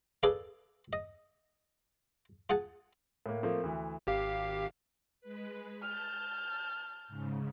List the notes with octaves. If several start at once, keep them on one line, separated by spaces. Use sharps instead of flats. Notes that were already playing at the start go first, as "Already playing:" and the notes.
G#4 A4 B4 D5 F5
D#5
F4 G#4 F#5 A5
A2 A#3
F3 A3 A#3 C4
D2 E3
G#1 G4 F5
G#3 B4
A5 F6 G6
G#2 C#3